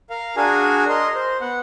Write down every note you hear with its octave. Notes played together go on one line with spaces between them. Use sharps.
A#4 F5
D4 F#4 G#4 A#4 G#5
A#4 D#5 C6
C5
B3 F#5